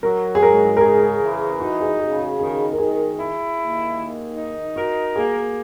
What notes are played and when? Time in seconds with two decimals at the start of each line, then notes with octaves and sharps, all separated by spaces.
0.03 F#3 A#4
0.35 G#4
0.42 G#2 A#4
0.77 A#4
0.81 C#3 G#4
1.21 E3
1.60 D#4 F#4
1.81 G#4
1.99 C#3 G#4
2.19 F#4
2.39 D#3 G#4
2.72 A#4
2.78 D#3 G#4
3.18 E4
3.58 D#2
3.97 D#3
4.36 D#4
4.76 F#4 A#4
5.16 A#3 G#4